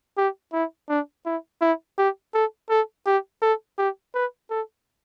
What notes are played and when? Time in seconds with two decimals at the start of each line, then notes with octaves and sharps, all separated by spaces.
0.17 G4
0.53 E4
0.89 D4
1.26 E4
1.61 E4
1.98 G4
2.34 A4
2.70 A4
3.06 G4
3.42 A4
3.79 G4
4.15 B4
4.50 A4